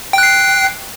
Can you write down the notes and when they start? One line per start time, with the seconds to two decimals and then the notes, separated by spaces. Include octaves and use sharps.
0.13 G5
0.18 F#6
0.23 C7